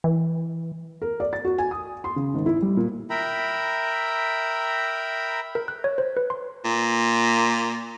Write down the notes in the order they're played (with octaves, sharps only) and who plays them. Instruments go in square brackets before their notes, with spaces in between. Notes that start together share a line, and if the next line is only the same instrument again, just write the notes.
[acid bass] E3
[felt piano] A#4
D5
A6
F#4
G#5
D#6
C6
C#3
G#1
E4
G3
A#2
[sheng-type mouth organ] A#4 E5 G5 A#5 B5
[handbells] A#4
F#6
C#5
C5
B4
C6
[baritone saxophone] A#2